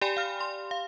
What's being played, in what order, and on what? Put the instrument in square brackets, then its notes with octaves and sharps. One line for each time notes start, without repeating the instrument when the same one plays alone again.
[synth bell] G4 D5 G5 G#5 B5
F5 F6
C6
F5